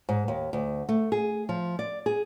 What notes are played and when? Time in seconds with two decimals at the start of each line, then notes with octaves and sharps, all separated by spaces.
0.09 G#2
0.28 D#2
0.53 D2
0.89 A3
1.12 G#4
1.49 F3
1.79 D5
2.06 G#4